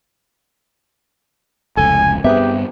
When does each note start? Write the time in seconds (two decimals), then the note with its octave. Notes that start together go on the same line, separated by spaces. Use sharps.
1.77 F1 C#2 A4 G#5
2.24 G2 B3 C4 G4 G#4 B4 E5